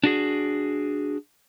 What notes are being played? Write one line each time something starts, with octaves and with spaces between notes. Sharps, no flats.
D4 F#4 G#4